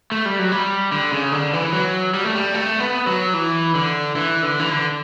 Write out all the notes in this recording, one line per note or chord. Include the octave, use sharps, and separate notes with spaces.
A3
G3
F#3
G3
D3
C#3
D3
E3
F#3
G3
A3
G3
A3
B3
F#3
E3
D3
E3
D3
E3
D3